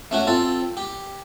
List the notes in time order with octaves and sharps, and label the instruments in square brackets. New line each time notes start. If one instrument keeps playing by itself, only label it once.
[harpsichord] A3 C#4 F#4
C4 F4 A4
G4